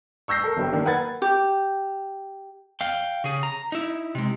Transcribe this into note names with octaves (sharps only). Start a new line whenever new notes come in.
C#6 E6 G6 A#6 C7
A4 A#4
G1 G2 G5
D#3 A#3 D4
A#4 B4 F#5 B5 G#6 A6
G4
F5 G5
C#3 G#4
A#5
D#4 E4
C3 G#3